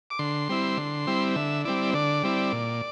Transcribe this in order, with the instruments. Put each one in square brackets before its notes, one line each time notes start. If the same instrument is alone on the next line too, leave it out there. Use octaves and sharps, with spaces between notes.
[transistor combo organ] D6
D3 C6
G3 C4 E4
D3
G3 C4 E4
D3 E5
G3 C4 E4 D5
D3 D5
G3 C4 E4
A#2